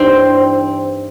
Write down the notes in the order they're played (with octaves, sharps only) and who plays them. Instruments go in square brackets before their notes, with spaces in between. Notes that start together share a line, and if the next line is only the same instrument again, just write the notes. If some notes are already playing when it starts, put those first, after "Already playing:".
Already playing: [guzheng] G2 E3 G3 C4 D#4